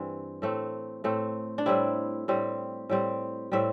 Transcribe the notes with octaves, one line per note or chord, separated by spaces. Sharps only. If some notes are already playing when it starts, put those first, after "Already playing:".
Already playing: G2 E3 C4
A2 A3 C4
A2 A3 C4
D4
A2 G3 C4 E4
A2 G3 C4
A2 G3 C4
A2 G3 C4 E5